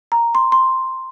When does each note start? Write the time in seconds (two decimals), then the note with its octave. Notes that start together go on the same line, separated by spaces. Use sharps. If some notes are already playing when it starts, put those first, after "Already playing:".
0.12 A#5
0.35 C6
0.52 C6